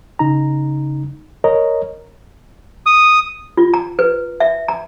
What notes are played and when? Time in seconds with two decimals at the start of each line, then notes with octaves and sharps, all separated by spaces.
0.19 C#3 D#4 A#5
1.44 A#4 C#5 D#5 A#5
2.86 D#6
3.57 F4
3.74 A#5
3.99 B4
4.40 E5
4.68 A#5